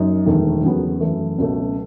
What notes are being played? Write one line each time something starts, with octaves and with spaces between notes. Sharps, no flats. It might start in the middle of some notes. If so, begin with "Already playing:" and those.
Already playing: F#1 F#2 D#4
E1 E2 D#3 A3
E2 C#3 F#3 B3
F#2 E3 A3
C#2 B2 F#3 A3